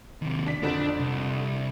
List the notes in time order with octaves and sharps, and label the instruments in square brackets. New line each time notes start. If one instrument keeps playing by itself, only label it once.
[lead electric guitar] D#2 C3
[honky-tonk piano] D4 B6
[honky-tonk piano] F2 D3 [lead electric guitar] D4
[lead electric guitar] C2